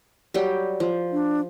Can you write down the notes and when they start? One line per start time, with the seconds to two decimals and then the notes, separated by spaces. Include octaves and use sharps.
0.34 F#3 G3 G4
0.80 F3
1.12 D4